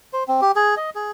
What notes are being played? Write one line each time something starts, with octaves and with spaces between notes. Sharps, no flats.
C5
C4
G4
G#4
D#5
G#4